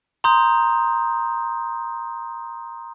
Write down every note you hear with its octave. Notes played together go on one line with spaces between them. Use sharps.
A#5 C6 D#6 G6